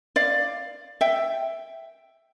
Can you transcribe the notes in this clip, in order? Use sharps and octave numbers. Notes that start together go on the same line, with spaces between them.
D5 F5
E5 G5